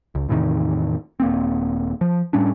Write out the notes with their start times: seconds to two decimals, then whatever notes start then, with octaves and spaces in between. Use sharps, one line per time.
0.15 C#2
0.29 E2 A2 C3 D#3
1.20 D#1 A#3 C4
2.01 F3
2.33 A2 G3 C#4 D4